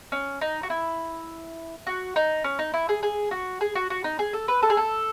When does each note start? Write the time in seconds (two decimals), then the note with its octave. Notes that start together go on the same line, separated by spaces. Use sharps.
0.12 C#4
0.41 D#4
0.63 F#4
0.70 E4
1.87 F#4
2.16 D#4
2.44 C#4
2.59 D#4
2.74 E4
2.89 G#4
3.03 G#4
3.31 F#4
3.61 G#4
3.75 F#4
3.90 F#4
4.04 D#4
4.19 G#4
4.33 A4
4.48 B4
4.63 A4
4.70 G#4
4.77 A4